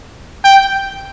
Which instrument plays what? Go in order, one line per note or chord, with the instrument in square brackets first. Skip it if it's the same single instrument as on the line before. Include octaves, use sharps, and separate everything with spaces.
[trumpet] G5